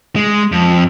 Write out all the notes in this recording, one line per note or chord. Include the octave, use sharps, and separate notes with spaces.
G#3
F2